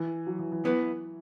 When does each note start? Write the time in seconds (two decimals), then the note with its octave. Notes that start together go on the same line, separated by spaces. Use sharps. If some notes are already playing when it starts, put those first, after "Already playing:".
Already playing: E3
0.27 F#3
0.39 E3
0.52 E3
0.64 E3 B3 E4 B4